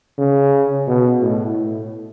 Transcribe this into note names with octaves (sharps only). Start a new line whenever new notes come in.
C#3
B2
A2
A2